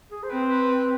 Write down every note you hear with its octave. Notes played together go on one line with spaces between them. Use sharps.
G#4
C5
C4 B4
B4